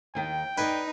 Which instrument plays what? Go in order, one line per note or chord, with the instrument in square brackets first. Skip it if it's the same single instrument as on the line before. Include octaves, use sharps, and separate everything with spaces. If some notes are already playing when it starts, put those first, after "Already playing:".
[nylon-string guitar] D#2 D#3 [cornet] G5
[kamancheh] D#4 [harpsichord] B4 [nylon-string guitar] D5 G#5